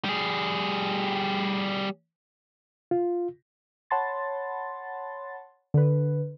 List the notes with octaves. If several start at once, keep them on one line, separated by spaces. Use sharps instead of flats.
G3 G#4
F4
C#5 F#5 A5 B5 C6 A6
D3 B4